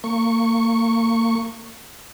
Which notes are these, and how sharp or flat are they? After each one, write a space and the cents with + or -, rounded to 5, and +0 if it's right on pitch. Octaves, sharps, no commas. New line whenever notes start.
A#3 -30 C#6 +0